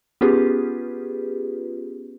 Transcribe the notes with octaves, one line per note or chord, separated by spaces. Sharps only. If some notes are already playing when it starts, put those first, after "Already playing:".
B3 C#4 F4 G4 G#4 B4